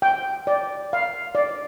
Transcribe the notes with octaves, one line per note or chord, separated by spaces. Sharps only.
G5
D5
F5
D5